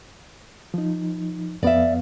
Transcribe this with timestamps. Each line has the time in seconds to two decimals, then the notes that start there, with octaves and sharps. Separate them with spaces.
0.74 F3 D#4
1.63 F2 B3 D5 E5 F5